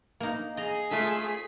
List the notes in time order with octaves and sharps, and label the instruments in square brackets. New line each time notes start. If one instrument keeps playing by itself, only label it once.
[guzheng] A#3 D#4
[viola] G#4 [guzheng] D#5 A#5
[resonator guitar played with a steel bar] A3 F4 A4 [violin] B6